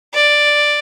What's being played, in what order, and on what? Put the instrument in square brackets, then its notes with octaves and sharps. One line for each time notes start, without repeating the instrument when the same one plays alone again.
[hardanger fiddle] D5